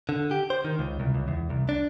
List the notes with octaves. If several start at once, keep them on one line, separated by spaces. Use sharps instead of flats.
D3
G4
C5
D#3
C#2
C2
C#2
E2
C2
D4